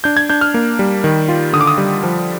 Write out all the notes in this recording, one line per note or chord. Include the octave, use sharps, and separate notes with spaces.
D4 G6
G#6
D4 G6
F6
A#3
G3
D#3
F4
D3 D#6
D6
D#6
G3
F3